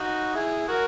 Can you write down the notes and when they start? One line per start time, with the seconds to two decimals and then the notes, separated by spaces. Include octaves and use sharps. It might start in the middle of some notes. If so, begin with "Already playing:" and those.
Already playing: D#4 F#4
0.34 E4 G#4
0.68 F#4 A#4